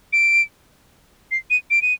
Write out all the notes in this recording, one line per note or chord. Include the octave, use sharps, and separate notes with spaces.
D7
C7
D#7
D7
D#7